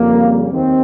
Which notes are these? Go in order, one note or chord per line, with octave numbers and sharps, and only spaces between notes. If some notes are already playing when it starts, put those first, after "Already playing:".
Already playing: F2 C#3 G3 A#3
D#2 D#3 C4